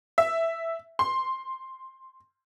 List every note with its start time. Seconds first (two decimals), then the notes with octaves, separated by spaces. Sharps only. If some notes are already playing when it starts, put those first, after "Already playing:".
0.18 E5
0.99 C6